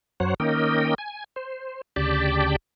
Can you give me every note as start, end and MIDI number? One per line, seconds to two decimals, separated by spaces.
0.20 0.34 42
0.20 0.34 54
0.20 0.34 72
0.20 0.34 73
0.20 0.34 78
0.40 0.95 51
0.40 0.95 58
0.40 0.95 61
0.40 0.95 70
0.40 0.95 75
0.40 0.95 79
0.98 1.24 80
1.36 1.81 72
1.96 2.56 38
1.96 2.56 49
1.96 2.56 67
1.96 2.56 74
1.96 2.56 79
1.96 2.56 81